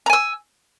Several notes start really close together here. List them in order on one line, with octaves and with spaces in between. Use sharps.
A#5 G#5 E6